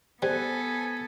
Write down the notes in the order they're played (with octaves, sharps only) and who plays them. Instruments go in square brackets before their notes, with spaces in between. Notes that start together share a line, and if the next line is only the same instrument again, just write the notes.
[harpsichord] G3 [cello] B3 A4 [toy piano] C5 [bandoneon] G#5